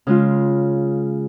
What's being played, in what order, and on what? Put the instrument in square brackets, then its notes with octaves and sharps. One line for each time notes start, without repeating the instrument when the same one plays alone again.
[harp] C#3 G#3 F4